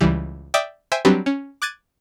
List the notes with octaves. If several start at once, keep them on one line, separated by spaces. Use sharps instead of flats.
C#2 E3 G3
D5 E5 G5 D6 D#6
C5 E5 G5 G#5
F#3 G3 C4 D4 G4 B4
C#4
D6 F#6 G#6 A6 D#7